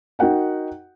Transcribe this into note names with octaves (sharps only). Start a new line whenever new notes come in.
D#4 F#4 A#4 F#5 G5